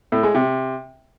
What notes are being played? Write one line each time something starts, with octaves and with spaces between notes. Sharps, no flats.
A2
G#3
C3